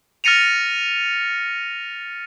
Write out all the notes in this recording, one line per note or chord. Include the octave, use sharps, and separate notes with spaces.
F6 A6 A#6 C#7 D#7 F7